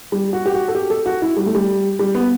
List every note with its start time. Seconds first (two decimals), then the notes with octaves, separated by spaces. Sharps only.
0.12 G3
0.33 F#4
0.46 G4
0.54 F#4
0.68 A4
0.75 G4
0.90 A4
1.06 F#4
1.22 E4
1.37 G3
1.46 A3
1.55 G3
1.99 G3
2.15 B3